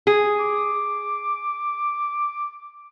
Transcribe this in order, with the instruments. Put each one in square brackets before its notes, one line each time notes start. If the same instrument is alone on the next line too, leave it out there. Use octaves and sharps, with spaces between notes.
[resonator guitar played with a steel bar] G#4
[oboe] D6